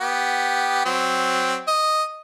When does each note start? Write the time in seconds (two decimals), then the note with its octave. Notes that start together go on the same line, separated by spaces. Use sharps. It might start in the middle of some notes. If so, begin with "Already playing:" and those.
0.01 B3 G4
0.85 F#3 C4
1.68 D#5